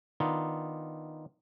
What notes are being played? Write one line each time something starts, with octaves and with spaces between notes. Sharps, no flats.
D#3 B3 D4 D#4 F4